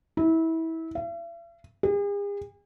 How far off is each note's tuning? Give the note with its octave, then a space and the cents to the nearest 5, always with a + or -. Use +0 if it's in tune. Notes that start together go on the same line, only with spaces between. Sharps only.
E4 -25
E5 +45
G#4 -45